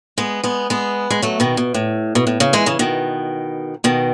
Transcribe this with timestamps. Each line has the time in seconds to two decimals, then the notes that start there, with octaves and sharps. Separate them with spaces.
0.18 G#3 B3
0.44 G#3 B3
0.70 G#3 B3
1.10 G#3
1.22 F#3 A3
1.40 B2 D#3
1.57 B2
1.74 A2
2.15 B2
2.27 A2
2.40 C#3
2.53 E3 G#3
2.66 C#3 E3
2.79 B2 D#3
3.84 B2 D#3